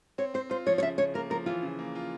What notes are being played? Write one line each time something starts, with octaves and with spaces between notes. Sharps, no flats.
C4 C#5
C4 C5
F4 C5
F3 C#5
C#5
C#3 E5
C#3 C#5
A#3 A#4
F3 A#4
E3 F4
C#3
A#3
F4